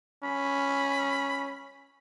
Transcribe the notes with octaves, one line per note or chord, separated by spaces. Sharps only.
C#4 B5